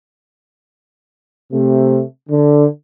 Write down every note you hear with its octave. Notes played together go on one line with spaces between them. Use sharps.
C3 A3
D3